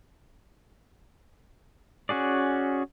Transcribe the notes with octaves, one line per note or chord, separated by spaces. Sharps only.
C#4 F#4 G#4 D5